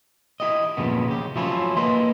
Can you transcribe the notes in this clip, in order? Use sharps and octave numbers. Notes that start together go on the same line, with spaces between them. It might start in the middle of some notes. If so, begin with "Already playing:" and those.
E4 G4 D#5
F2 A#2 C#3 B3
C#3 G4
F3 F#3 A3 C#4 E4 F4
A#3 B4 D#5 C6